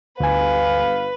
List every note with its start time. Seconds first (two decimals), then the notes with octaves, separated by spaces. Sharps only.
0.20 G1 D2 B4 F5 G#5